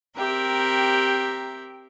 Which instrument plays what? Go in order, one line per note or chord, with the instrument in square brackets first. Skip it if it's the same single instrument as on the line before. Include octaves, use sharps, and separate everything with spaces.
[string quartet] C4 G4 A#4 E5